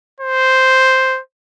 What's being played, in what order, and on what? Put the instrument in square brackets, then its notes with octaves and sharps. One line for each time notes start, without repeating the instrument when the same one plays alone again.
[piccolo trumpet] C5